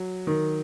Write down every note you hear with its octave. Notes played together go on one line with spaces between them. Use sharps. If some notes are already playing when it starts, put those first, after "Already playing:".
Already playing: F#3
D#3